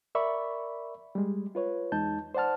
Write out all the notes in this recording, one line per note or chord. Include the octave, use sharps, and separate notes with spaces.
A#4 D5 E5 B5 C#6
G3 G#3
F4 B4 C#5
E2 G#3 D#4 A5 G6
C5 D5 F#5 A5 F6